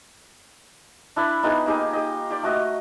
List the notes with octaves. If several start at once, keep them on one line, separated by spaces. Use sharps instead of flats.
D4 E4 B5
B3 D#4 F4 G#4
A#3 D#4 G4 G#4
G4 D#5
G4 D5
A3 F#4 D#5